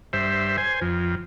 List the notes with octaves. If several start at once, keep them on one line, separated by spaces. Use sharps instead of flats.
G2 C5 E5
C5 G#5
F2